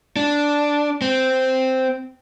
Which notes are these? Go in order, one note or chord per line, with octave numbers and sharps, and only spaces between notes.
D4
C4